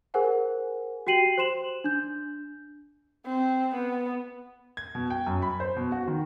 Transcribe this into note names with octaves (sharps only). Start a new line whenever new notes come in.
G#4 A#4 C5 F#5 G#5
F#4 G4 G5 C7 D#7 F#7
C5 C6 E7 F#7
D4 G6
C4
B3
G#6
B2
G5
F#2
B5
C5
B2
F#4
D#3